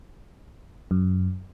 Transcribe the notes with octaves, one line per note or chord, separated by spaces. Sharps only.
F#2